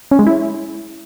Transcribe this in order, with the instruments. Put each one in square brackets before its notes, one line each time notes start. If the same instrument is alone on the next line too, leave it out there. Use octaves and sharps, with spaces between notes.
[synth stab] C#4
G#3
E4